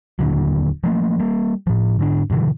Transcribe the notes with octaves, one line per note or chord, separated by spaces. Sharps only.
D#1 A#2 D3 F#3
F3 A3 A#3
G3 A#3
A2 F3
G#2 D3 D4
G2 B2 D3 E3